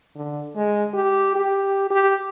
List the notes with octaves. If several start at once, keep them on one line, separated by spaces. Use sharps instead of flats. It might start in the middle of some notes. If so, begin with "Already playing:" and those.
D3
G#3
G4
G4
G4